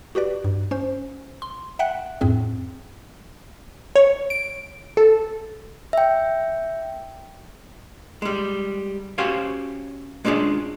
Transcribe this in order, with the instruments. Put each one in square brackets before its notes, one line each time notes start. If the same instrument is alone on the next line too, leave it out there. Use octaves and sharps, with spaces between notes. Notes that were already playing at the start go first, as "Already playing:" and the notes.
[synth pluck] F#4 G4 B4 D5
G2
C#4 C5
C6
E5 F#5 G5 F#6
F2 A2 C4 G#4
[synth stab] C#5
D7
A4
[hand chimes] E5 G5
[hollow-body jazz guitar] G3 G#3
C#4 F#4 G4 C5 C#5 F5
G#3 C#4 D4 F4 G#4